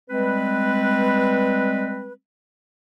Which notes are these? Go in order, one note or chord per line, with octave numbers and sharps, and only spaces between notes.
G3 G#3 C4 B4